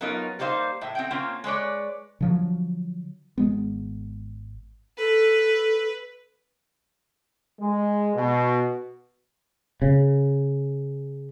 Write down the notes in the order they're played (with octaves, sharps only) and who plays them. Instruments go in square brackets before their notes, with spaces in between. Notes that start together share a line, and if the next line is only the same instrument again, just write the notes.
[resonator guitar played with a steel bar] F#3 B3 C#4 D#4 F4 A#4
G3 A#3 D#4 C5 F5
A2 E5
C4 F#5 G5
A#3 C4 C#4 F4
G#3 B4 C#5 D5
[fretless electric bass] D3 F3 F#3
G#1 G#3 B3
[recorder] A4 [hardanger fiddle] B4
[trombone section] G#3
B2
[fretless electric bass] C#3